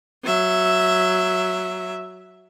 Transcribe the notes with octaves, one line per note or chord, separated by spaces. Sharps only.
F#3 E5